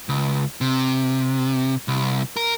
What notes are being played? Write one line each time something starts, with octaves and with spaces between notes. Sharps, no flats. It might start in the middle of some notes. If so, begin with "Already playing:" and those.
C#2
C3
C2
A#4